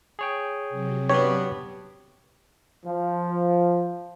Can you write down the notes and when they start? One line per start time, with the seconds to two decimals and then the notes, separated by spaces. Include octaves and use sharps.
0.19 G#4 C#5 G5
0.69 C3 F#3
1.09 G2 B3 G4 C#5
2.86 F3